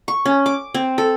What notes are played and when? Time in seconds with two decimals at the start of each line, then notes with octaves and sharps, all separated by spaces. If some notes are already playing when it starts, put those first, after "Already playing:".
0.08 C#6
0.25 C#4
0.46 D6
0.74 C4
0.98 A4